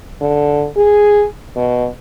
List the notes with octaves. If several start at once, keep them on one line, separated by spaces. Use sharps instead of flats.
D3
G#4
B2